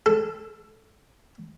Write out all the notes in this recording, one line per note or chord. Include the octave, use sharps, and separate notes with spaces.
A4